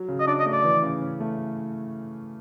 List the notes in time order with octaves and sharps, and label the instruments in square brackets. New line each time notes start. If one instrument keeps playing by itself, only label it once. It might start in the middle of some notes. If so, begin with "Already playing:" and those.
Already playing: [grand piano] F#3
C#3
[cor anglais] D#5
[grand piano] D4 [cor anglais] D5
[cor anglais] D#5
[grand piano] A3
[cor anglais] D5
[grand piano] E3
C#3
C#4
A3